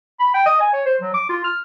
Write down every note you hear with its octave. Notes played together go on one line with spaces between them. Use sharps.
B5
G5
D#5
G#5
C#5
C5
F#3
D6
F4
F6